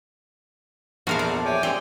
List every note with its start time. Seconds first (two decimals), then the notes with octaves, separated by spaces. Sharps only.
1.07 A#1 E2 F3 F#4 A#4 F5
1.19 A4 D5
1.45 C#5 E5 G5 G#5 D6
1.63 G#3 C4 G4 D5